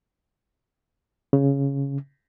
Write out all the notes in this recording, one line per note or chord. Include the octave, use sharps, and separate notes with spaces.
C#3